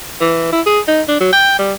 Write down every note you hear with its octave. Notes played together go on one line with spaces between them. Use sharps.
E3
E4
G#4
D#4
D4
F#3
G5
G3